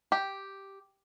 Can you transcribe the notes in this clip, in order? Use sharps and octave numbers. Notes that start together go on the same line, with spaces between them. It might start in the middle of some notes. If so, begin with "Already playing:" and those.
G4